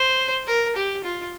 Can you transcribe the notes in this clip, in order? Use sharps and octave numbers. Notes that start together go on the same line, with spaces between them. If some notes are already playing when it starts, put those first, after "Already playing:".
Already playing: C5
A#4
G4
F4